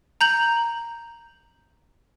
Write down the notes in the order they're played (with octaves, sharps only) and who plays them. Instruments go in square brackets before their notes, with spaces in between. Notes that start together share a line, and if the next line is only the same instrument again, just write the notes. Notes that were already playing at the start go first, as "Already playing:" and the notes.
[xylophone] A#5 G6 F#7